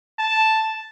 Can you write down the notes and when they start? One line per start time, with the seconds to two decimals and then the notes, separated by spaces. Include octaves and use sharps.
0.19 A5